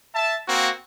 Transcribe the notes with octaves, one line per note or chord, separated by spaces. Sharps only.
E5 A5
A#3 C4 F#4